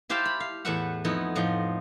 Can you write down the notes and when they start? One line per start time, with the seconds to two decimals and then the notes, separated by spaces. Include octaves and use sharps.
0.09 E4 G4 C5 F5 G5 A5
0.25 B5
0.40 F5
0.65 E2 A2 A3 B4 E5 F#5
1.05 F2 B3 D#4 E4
1.36 A2 F3 D#5